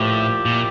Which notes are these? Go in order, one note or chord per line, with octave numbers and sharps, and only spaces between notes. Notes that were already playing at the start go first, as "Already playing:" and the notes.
Already playing: A2 F3 A#3 E4 G4 D5
A#2